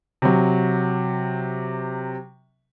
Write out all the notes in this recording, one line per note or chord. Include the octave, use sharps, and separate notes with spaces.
C3 F#3